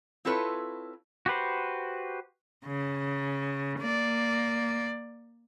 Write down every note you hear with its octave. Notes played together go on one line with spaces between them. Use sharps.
C4 E4 F4 A4 B4 C#5
F#4 G4 B4 C5
C#3
A#3 D5